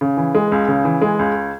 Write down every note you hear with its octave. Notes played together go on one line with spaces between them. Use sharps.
C#3
E3
G#3
C#2
C#3
E3
G#3
C#2